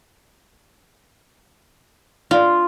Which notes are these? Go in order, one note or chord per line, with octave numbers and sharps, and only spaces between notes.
F4